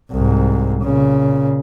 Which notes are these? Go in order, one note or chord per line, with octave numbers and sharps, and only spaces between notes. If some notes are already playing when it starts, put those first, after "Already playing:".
C2 G#2
A#2 C#3